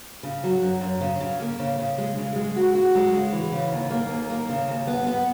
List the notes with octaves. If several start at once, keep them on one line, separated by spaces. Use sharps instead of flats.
C#3
F#3
F#2
F#2
C#3
C#3
A#3
C#3
C#3
G#3
C#3
G#3
F#4
F#4
G#3
C#3
E3
C#3
D#2
A#3
D#2
A#3
C#3
D#2
B3
B3